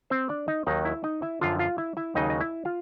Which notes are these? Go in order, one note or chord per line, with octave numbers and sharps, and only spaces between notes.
C4 C5
D4 D5
D#4 D#5
D#2 D#3 F#3 D#4 D#5
E4 E5
D#4 D#5
E4 E5
F#2 D3 F3 F4 F5
F4 F5
E4 E5
E4 E5
D#2 C#3 F#3 D#4 D#5
D#5
E4 E5
F4 F5